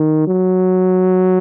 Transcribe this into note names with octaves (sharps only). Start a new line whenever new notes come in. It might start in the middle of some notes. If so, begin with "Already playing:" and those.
Already playing: D#3
F#3